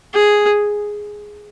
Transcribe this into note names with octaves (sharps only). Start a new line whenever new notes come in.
G#4